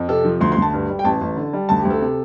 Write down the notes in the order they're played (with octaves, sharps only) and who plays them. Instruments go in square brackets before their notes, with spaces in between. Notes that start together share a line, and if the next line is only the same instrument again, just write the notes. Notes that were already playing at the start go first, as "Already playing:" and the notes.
Already playing: [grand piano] F2
C3 A4
F3
D2 C6
D2 C6
A5
G2
G3
G5
A1 A5
A1
D3
G3
D2 A5
G4
D2
A4
C3